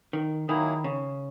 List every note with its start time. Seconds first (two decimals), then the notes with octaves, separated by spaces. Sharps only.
0.13 D#3
0.48 D#3 F#3 A#3 E4 G#4
0.84 C#3